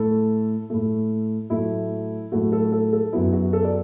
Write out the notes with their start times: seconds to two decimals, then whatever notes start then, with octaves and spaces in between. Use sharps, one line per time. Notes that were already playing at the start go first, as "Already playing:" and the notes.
Already playing: A2 A3 A4
0.70 A2 A3
1.50 A2 F#3 A3 E4
2.32 A2 F#3 A3 F#4
2.52 A4
2.72 A4
2.93 A4
3.13 F#2 F#3 B3 E4
3.33 F#4
3.53 A4
3.64 D5